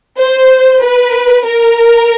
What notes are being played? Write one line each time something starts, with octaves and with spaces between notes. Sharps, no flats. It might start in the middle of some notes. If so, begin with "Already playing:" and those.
C5
B4
A#4